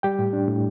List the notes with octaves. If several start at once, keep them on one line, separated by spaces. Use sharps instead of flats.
G3 G4 G5
A2
D4
A2